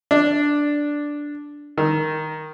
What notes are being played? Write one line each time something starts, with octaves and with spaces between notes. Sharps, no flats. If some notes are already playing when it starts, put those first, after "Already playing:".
D4
D#3